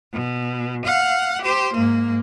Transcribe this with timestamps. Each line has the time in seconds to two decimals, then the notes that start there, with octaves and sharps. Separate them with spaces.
0.13 B2
0.86 F5 F#5
1.42 G4 C5
1.74 G#2 A#3